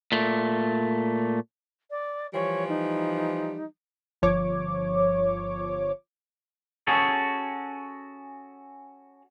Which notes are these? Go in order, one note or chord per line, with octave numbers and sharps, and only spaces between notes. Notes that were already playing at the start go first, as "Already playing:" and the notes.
A#2 A3
D5
E3 F3 G3 C#5
D#4
G1 F3 C#5 D6
C#4 F#4 G#4 A4